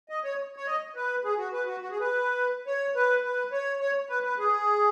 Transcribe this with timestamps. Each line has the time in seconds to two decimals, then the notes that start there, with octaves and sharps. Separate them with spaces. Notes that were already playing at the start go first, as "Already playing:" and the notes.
0.09 D#5
0.24 C#5
0.56 C#5
0.66 D#5
0.96 B4
1.24 G#4
1.38 F#4
1.53 B4
1.66 F#4
1.81 F#4
1.91 G#4
2.00 B4
2.67 C#5
2.95 B4
3.23 B4
3.52 C#5
3.81 C#5
4.09 B4
4.24 B4
4.38 G#4